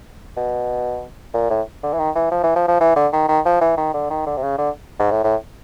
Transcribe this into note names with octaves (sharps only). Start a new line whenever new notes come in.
B2
A#2
A2
D3
E3
D#3
E3
F3
E3
F3
F3
E3
D3
D#3
D#3
F3
E3
D#3
D3
D#3
D3
C3
C#3
D3
G#2
A2
A2